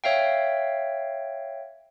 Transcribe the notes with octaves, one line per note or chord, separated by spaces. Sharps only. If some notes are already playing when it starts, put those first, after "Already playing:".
C#5 E5 F5 G5